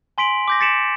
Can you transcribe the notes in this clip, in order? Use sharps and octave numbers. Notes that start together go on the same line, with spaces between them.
G#5 C6 B6 D7 F#7
D6 G6 A#6
A6 B6 C#7 D7 E7 F#7